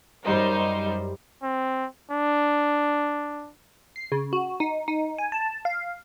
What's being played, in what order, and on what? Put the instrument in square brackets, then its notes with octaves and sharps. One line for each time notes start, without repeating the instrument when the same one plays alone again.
[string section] F#2 G3 D#4 C5
[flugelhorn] C4
D4
[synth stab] C7
C#3
F#4
D#4
D#4
G#5
A5
F5